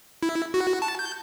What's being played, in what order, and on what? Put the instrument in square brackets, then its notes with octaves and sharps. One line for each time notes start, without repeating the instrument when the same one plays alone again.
[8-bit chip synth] E4
F#4
A5
G6